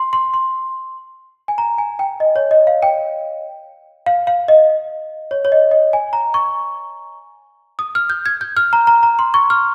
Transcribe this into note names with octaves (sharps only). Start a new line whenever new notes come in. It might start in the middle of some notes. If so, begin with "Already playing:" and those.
Already playing: C6
C6
C6
G#5
A#5
G#5
G5
D#5
C#5
D#5
F5
G5
F5
F5
D#5
C#5
C#5
D#5
D#5
G#5
A#5
C#6
D#6
F6
G6
G#6
G6
F6
A#5
A#5
A#5
C6
C#6
F6